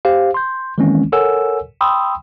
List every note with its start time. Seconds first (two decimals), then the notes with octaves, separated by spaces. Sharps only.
0.05 G4 C5 F5
0.34 C6 G6
0.78 D#3 E3 G#3 A#3 C4 C#4
1.12 A4 A#4 C#5 F#5 G#5 E6
1.81 G5 B5 C6 D#6 E6